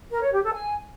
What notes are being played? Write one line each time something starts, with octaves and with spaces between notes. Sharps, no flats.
A#4
C#5
G4
A4
G#5